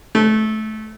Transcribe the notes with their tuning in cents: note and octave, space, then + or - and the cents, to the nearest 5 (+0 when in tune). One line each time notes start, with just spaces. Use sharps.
A3 -20